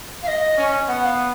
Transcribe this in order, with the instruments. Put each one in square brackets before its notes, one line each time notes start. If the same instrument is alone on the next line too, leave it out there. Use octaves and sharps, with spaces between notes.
[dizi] F5
D#5
[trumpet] C#4
[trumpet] B3 [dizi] F#5
[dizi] F5